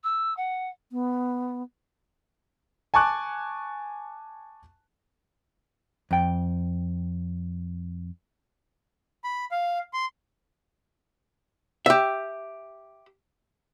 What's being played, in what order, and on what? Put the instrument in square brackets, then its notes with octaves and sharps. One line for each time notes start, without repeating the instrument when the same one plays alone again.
[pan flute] E6
F#5
[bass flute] B3
[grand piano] G#5 A5 C#6 D6 F#6
[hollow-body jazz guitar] F2 G5
[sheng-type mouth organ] B5
F5
C6
[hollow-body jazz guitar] G4 E5